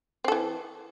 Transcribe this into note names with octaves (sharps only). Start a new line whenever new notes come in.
E3 C4 A4